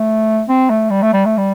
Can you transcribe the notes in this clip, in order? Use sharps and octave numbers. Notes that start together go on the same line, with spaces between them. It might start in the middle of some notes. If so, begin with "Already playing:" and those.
Already playing: A3
C4
A3
G3
A3
G3
A3
G3